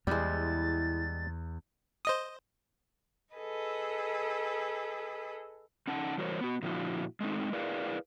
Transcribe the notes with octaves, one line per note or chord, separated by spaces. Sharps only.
E2 G3 G#3 E4 C5 A6
C5 D#5 D#6
G#4 A4 B4 D#5
C#4 D#4 F#5 A5
E3 G3 F#4 A#4 C5 C#5
B3 F#4
A#2 D3 F3 D#4 E4 F#4
G#3 A3 C4 D#4
E4 G#4 A#4 B4 D5 F5